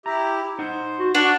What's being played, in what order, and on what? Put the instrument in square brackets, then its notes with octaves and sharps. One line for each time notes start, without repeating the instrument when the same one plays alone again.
[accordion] E4 G4 [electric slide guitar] A#5
[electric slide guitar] D#4 F#5 [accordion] C5
[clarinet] F#4
[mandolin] D4 [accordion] D5 C#6 [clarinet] F#5